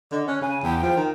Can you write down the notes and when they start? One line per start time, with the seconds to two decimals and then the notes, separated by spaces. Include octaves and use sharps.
0.12 D3 D#5
0.28 C#4 F#6
0.42 C#3 G#5
0.63 E2 G5
0.83 F3
0.97 D#3